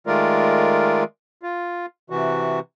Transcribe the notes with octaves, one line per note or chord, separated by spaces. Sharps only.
D#3 G#3 A3 F4 A#4 D5
F4
C3 E3 F#4